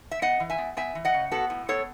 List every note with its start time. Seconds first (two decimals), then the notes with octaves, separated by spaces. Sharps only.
0.11 E5
0.22 B3 D#5 F#5
0.40 E3
0.50 E5 G#5
0.58 B3
0.77 B3 E5 G#5
0.95 E3
1.05 D#5 F#5
1.14 C#3
1.32 B3 F#4 A4
1.50 A2
1.69 B3 A4 C#5